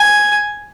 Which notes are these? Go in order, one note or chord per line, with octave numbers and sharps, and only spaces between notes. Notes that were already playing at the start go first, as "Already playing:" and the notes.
Already playing: G#5